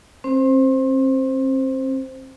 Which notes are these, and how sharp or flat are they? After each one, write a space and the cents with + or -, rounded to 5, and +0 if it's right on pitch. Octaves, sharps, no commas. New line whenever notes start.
C4 +35 C5 +0